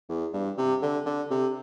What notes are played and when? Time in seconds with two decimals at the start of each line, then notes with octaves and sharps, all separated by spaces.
0.09 E2
0.33 G2
0.58 C3
0.82 D3
1.06 D3
1.31 C3